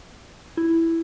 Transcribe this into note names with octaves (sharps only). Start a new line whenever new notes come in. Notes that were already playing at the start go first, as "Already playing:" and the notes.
E4